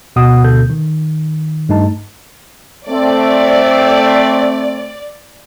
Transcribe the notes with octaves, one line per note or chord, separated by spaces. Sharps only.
D2 B2 F#5 D#6
D2 B2 D3 A4 G6
D#3
G2 A3 D#4 A5
A3 C4 D5